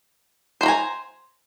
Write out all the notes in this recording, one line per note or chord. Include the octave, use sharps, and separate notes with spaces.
C5 G#5 A#5 B5